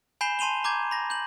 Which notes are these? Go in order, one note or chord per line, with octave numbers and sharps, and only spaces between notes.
G#5 B5 G6 C7 E7 G7
A5 C6 D#7 F7 G7
A#5 D6 G6 G#6
B5 A#6
G6 F#7